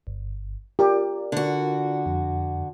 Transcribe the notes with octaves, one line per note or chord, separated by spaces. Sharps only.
G1
F4 G4 A#4 D5
D3 F#4
F2